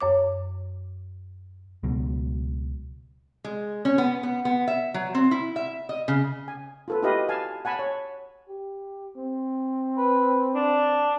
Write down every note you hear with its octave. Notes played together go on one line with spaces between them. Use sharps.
F#2 C#5 D6
C#2 B2 F#3
G#3
C#4
B3
B3
B3
E5
F#3
C4
E4
E5
D#5
C#3
G#5
F4 A4 B4
E4 F#4 G4 B4 D#5 F5
F5 G#5 A5
F#5 G#5 A5 B5
C#5
G4
C4
B4
D4